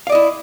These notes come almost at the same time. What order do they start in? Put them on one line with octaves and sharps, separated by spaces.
F5 D5 D#5 E4